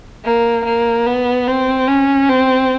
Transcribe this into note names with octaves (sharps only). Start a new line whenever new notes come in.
A#3
A#3
B3
C4
C#4
C4